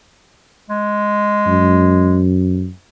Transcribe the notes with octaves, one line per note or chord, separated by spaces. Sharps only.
G#3
F#2